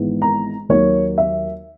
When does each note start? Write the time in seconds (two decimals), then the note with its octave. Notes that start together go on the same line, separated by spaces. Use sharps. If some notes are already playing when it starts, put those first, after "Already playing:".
Already playing: G#1 G#2 E3 G#3 B3
0.22 A#5
0.69 D#2 D#3 F#3 A#3 C#5
1.18 E5